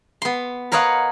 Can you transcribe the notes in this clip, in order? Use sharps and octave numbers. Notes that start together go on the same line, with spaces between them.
B3 C6
A#4 B4 C#5 D#5 F5 F#5